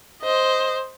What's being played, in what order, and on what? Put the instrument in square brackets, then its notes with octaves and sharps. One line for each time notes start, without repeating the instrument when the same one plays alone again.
[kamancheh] C5 D#5